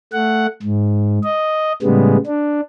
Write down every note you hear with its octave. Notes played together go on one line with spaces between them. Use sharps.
A3 F#5
G#2
D#5
A2 C#3 G3 G#3 B3
D4